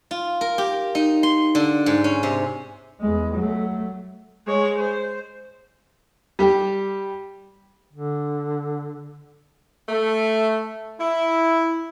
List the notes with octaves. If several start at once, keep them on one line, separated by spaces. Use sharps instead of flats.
F4
A#4
G4
D#4
C6
D3
G#2
C#4
C3
E2 G#3
F#3 A3
G#3 C#5
C5
G3 G4
D3
A3
E4